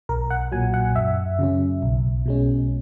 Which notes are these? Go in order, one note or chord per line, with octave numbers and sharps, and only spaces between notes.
B1 A#4
F#5
A#2 F#3 G#5
F#5
F#2 E5
C#3 F#3 C#4
B1
B2 G#3 C#4